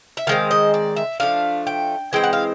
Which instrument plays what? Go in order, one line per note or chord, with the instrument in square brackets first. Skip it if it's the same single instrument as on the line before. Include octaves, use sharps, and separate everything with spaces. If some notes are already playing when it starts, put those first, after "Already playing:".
[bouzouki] E5
D#3 G#3 C4 F5
D#5
D5
E5
F3 A3 D4 F5
G5
E3 G#3 C4 G5
F#5
F5